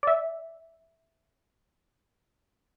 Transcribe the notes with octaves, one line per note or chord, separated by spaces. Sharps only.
D5 E5